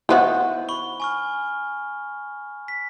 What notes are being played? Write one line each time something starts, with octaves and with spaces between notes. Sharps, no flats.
D#3 B3 E4 F#4 C5
B5 C#6 G7
G#5 C#6 F6
B6